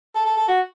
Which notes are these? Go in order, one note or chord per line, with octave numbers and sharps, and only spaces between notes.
A4
A4
A4
F#4